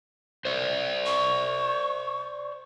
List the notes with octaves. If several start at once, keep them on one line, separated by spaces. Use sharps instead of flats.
C5 D5
C#6